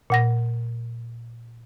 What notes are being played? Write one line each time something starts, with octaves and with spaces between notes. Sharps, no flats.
A#2 F#5 A#6